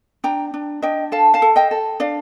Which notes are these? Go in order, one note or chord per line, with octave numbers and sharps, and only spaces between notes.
D4 G5 A#5
D4
D4 D#5 G5
A4 F5 A5
F5 A5
A4
D#5 G5
A4
D4 D5 F5